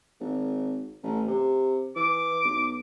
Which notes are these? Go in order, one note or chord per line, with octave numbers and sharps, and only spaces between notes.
G#1
A1
C3
E3 D6
B1